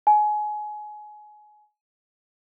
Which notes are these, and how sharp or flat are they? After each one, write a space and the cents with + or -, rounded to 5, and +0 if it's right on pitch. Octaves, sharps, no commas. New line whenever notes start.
G#5 +25